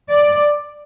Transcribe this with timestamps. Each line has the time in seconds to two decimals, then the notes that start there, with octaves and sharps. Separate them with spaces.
0.11 D5